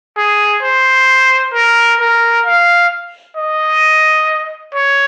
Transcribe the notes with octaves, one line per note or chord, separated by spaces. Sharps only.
G#4
C5
A#4
A#4
F5
D#5
C#5